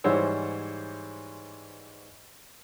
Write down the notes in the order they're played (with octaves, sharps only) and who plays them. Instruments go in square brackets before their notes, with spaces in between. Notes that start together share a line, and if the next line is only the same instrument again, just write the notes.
[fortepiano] G#2 E3 G3 C5 C#5 E6